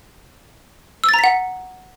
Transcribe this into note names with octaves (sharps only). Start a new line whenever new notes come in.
E6
A6
A#5
B6
F#5